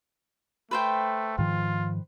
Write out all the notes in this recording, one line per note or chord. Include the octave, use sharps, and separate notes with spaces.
A3 B4 C5 G5
G#2 D#3 F3 F4